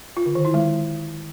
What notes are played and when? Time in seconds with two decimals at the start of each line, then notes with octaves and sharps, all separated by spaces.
0.17 F4
0.26 D3
0.35 D#3
0.45 E4
0.54 G#3